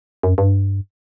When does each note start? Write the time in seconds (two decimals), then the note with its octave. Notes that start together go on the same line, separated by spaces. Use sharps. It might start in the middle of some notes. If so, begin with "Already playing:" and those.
0.23 F#2
0.38 G2